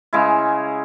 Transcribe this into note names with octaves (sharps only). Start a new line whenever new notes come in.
C#3 G#3 E4